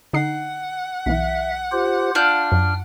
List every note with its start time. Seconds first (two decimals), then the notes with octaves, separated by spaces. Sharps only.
0.13 D3 D#4 F#5 C7
1.06 B1 E3 E5
1.72 F4 G4 C5
2.15 D4 F4 F6 G6
2.52 F#2